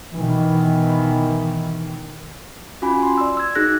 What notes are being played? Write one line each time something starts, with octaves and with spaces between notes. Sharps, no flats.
B2 D#3 E3
C#4 F4 F#4 G#5 B5
C6
D5 E6
E6 G#6
D#4 F#4 G#4 F#6 A#6